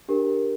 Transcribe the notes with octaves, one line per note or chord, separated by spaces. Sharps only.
D4 G4 A#4